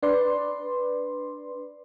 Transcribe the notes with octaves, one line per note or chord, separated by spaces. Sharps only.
D4 B4 D5 C6